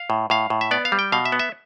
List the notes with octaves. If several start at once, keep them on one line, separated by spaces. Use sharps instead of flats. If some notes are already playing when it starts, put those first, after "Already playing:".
Already playing: F5
A2
A2 F5
A2
E5
B3 D5
F5
G3
G5
B2 F5
E5
B3
E5